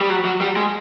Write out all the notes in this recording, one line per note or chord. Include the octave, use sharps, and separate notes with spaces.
G3
F#3
F#3
G3
G#3